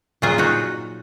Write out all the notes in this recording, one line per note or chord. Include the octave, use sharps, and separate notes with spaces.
A#2 F#3 F4 G#4
D#4 F#4